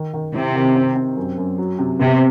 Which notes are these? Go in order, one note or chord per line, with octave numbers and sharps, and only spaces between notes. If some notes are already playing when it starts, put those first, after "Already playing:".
Already playing: D#3
D#3
C3 E4
D#3
C4
C4
F#2
F#2
F#3
C3
C3 B3